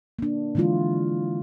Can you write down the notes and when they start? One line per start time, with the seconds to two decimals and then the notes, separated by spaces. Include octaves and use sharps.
0.19 A#3 D4
0.55 D3 E3 G#3 E4 F4